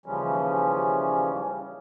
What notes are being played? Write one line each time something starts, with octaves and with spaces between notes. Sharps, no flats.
D#2 C#3 E3 F3 G3 C#4